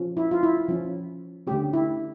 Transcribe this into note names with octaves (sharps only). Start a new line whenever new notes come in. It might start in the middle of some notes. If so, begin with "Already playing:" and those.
Already playing: F3 C#4
E4
F4
E4
F3 C#4
D3 A3 C#4 G4
E4